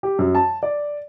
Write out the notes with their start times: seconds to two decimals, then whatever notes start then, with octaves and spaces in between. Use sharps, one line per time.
0.03 G4
0.19 F#2
0.35 A5
0.63 D5